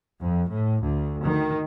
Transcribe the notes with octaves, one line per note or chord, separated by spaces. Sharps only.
F2
A2
D2
D#3